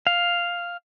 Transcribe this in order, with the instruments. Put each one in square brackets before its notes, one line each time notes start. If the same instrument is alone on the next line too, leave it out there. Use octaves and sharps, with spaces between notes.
[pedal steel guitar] F5